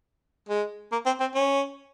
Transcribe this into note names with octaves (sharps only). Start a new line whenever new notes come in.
G#3
A#3
C4
C4
C#4